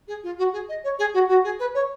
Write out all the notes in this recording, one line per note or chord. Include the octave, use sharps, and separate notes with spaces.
G#4
F4
F#4
G#4
D#5
C#5
G#4
F#4
F#4
G#4
B4
C#5